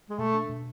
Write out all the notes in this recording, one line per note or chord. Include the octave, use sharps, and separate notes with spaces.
G#3
B2 A3
D4
B2